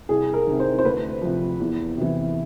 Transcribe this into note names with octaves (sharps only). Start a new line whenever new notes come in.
C2 G#4
A#4
C3 D#3
C5
C5
D2 B4
C3 F3
E2
C3 E3